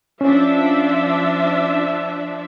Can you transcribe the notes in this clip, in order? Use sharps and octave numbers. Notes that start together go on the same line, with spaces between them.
F3 C#4 D4 E5